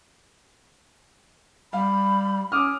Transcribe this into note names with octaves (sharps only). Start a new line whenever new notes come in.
G3 F5 B5
C#4 D6 D#6 F6